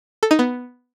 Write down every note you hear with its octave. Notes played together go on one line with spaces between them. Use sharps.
A4
D#4
B3